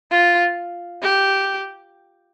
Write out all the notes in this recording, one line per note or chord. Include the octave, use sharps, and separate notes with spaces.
F4
G4